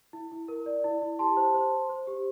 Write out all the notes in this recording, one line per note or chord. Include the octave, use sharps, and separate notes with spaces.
E4
E4
A#4
D5
E4
E4
G4 A5 C6
C5
C5
C5
C5
G4